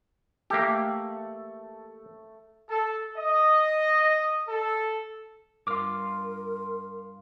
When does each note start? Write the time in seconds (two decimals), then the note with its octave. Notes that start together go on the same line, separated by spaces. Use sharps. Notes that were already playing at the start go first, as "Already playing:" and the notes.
0.50 A3 A#3 G4 A4
2.69 A4
3.17 D#5
4.48 A4
5.67 G2 F4 A#4 D6 F6